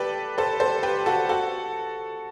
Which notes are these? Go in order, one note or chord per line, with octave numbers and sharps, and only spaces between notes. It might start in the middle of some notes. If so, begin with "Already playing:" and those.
Already playing: G4 A4 B4 D5
A4 C5
A4 C5
G4 B4
F#4 A4
F#4 A4